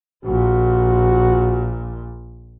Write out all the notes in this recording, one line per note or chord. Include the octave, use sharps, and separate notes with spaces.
A#1 A#2 F#4